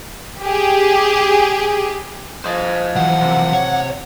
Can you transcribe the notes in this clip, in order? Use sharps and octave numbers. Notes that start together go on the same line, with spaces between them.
G4 G#4
F3 C5 D#5
E3 F#3 F#5
C3
C#5